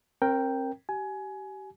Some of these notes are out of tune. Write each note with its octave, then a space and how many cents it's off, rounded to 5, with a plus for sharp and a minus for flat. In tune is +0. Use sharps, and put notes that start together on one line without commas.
C4 +40 A#4 +0 G5 +0
G4 -30 G#5 +20